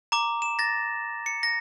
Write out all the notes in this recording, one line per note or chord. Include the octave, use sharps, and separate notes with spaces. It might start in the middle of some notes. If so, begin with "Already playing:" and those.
A#5 D6
E7
A6 A#6
C#7
A#6